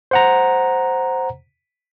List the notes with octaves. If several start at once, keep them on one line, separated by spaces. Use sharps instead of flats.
C5 F#5 A#5